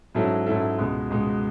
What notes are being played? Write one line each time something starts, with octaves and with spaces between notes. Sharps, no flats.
G#2 F#3 C#4 E4 A4
G#2 F#3 C#4 E4 A4
C#2 B2 G#3
C#2 B2 G#3